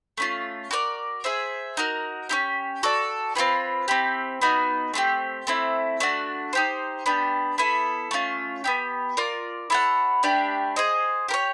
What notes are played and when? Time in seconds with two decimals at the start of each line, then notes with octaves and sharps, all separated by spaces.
0.18 A3 C#4 F4
0.71 F#4 A#4 D5
1.24 G#4 C5 E5
1.77 D#4 F#4 A#4
2.29 C#4 E4 G4
2.83 F#4 A4 D5
3.35 C4 F4 G#4 B4
3.88 C4 E4 G4
4.42 B3 D#4 F#4
4.94 A3 C4 E4 G4
5.47 A3 C4 E4
6.00 A3 D4 F#4
6.53 D#4 G4 C5
7.06 B3 D4 G4
7.58 B3 E4 A4
8.11 A3 C#4 F4
8.64 B3 E4 G4
9.17 F4 A#4 D5
9.70 E4 A4 C#5 F#5
10.23 A3 D4 G4 B4
10.76 G#4 C5 D#5
11.28 G4 A#4
11.34 C#5